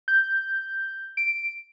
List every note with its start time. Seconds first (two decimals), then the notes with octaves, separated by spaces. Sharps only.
0.08 G6
1.17 D7